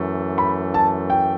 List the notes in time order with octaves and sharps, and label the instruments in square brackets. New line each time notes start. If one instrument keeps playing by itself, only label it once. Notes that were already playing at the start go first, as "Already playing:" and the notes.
Already playing: [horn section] F#2 E3 A3
[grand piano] B5
A5
G5